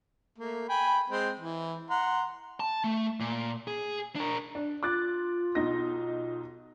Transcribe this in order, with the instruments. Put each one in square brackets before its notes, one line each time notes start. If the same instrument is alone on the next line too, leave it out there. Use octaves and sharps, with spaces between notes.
[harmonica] A3 A#3
G5 G#5 B5
G#3 C4
E3
F#5 A#5 C6
[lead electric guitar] A5
A3
A#2
G#4
D4 A#4
[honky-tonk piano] D4
[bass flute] F4 [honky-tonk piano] D6 F#6 A6
[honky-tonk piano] B1 D#4 A#6